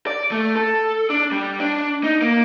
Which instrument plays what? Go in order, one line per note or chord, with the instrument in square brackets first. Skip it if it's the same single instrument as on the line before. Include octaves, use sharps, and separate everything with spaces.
[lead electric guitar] D5
A3
A4
D4
G3
D4
D#4
A#3